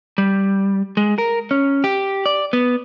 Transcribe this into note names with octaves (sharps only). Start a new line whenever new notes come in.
G3
G#3
A#4
C#4
G4
D5
B3